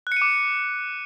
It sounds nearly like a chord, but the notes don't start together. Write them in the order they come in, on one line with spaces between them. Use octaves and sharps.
F#6 C#7 D#7 D6